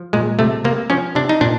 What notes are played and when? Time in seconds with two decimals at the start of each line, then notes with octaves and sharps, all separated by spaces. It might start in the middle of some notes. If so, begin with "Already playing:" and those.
Already playing: F3
0.13 A#2 G#3
0.39 C3 A3
0.65 C3 A#3
0.90 F3 C#4
1.15 C3 D4
1.29 D#4
1.41 A#2 D4